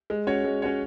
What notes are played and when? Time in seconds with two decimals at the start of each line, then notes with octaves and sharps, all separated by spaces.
0.10 G#3
0.27 C#4 F#4 C#5
0.44 G#3
0.62 C#4 F#4 C#5